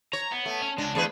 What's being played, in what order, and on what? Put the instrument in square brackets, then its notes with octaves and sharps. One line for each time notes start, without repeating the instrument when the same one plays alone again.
[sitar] C#5 [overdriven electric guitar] A#5
[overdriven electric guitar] B3
[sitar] A3
[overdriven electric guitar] C#4
[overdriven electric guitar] C#2 G#3 [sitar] D4
[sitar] E2 G#4 B4 [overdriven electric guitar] A3